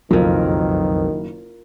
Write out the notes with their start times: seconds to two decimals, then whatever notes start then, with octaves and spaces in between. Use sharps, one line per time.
0.11 F#1 B1 F2 D#3 F4 A#4